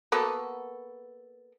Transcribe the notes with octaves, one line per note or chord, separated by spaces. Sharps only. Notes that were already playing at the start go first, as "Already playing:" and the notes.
A#3 B3 F#4 A4